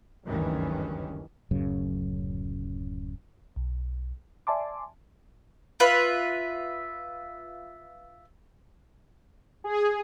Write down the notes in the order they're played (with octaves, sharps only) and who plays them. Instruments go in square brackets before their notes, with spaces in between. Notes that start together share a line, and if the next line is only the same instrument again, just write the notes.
[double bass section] F#1 D2 G2 D#3 E3 C#4
[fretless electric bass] D1 F#2 C#3
[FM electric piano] B1
D5 E5 G#5 A5 C6 D6
[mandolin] F4 B4 E5
[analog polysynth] G#4